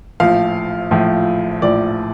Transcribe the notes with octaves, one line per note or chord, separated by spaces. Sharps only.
A#1 A2 F3 F5
A#1 A2 F3
A#1 A2 F3 D5